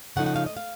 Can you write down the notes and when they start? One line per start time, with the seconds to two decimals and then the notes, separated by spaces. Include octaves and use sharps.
0.16 C#3 F3 A3 D#4 F#5
0.26 F#5
0.36 F5
0.46 D#5
0.57 F5